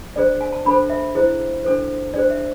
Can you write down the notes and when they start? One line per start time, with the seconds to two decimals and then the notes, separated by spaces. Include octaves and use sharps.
0.16 D4 G#4 C5 D5
0.41 G#5
0.53 A5
0.66 D4 A4 C5 B5
0.90 E5
1.15 E4 G#4 C5
1.64 D4 A4 C5
2.14 D4 G#4 C5 D5
2.30 E5